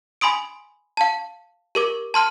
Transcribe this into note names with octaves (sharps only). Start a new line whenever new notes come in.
G#5 B5 C6 D#6 D7
F5 A5
G4 A#4 D6
A5 C6 F6 D#7